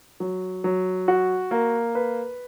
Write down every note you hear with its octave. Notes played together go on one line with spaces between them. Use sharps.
F#3
F#3
F#4
A#3
B4